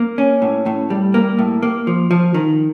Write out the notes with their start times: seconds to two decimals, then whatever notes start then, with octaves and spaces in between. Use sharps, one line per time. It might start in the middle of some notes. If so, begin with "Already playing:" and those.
Already playing: A#3
0.18 C#4
0.42 A2
0.66 A2
0.90 G3
1.14 A#3
1.39 A2
1.63 A#3
1.87 F3
2.11 F3
2.34 D#3